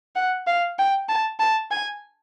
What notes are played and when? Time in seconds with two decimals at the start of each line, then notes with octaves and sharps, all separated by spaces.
0.16 F#5
0.47 F5
0.78 G5
1.09 A5
1.39 A5
1.71 G#5